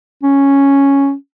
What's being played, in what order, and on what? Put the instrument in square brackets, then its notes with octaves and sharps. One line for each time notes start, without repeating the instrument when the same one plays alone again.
[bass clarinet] C#4